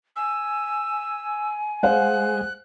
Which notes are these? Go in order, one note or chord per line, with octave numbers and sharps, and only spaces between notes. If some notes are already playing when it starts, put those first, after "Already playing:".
G#5 E6
G#3 C5 F5 F#5 F#6